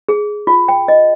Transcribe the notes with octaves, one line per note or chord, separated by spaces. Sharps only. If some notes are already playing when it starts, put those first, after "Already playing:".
G#4
F4
G5
D#5